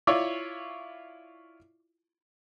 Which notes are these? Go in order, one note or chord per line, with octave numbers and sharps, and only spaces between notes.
E4 F4 C#5 D5